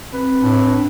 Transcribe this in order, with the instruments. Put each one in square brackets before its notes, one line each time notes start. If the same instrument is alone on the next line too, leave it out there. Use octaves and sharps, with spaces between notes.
[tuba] C4 [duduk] B4
[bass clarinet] A2 [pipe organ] D4